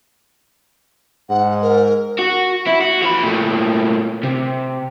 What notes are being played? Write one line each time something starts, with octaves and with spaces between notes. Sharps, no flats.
G#2 F#5
A#4
F#4
E4
F#4
F3 B5
A#2 A3
C3